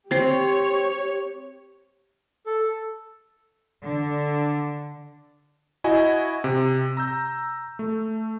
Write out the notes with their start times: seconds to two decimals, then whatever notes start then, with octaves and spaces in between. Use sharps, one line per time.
0.11 C4 G4 C5 C#5 C6
2.46 A4
3.82 D3
5.84 E4 F#4 D#5 G#5
6.44 C3
6.97 A#5 E6 G6
7.79 A3